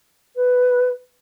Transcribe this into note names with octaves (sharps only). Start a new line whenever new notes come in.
B4